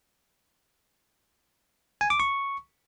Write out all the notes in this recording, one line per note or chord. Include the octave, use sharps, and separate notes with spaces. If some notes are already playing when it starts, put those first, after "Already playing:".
G#5
D6
C#6